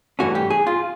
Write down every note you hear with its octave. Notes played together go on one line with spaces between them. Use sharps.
G2 E3 A3 C#4 F#4
G4
G#4
F4